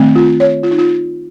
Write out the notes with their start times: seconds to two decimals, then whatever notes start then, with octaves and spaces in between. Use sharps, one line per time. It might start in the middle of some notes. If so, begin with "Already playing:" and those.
Already playing: D#3 A3 C4
0.15 F4
0.40 C#5
0.63 F4
0.71 D#4
0.78 F4